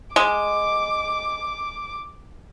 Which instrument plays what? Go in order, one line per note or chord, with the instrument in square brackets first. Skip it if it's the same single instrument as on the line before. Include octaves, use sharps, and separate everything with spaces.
[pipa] G#3 [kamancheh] D6